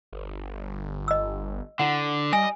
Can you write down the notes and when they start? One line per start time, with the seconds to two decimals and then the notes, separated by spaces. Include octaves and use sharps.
0.13 G1
1.08 D#5 E6
1.79 D3 E4 F#5
2.33 G3 D#5 G#5